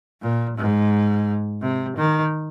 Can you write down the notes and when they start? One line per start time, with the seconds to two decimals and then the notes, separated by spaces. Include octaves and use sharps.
0.22 A#2
0.58 G#2
1.62 C3
1.97 D#3